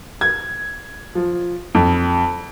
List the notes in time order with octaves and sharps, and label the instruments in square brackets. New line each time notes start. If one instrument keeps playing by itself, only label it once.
[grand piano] G#6
F3
F2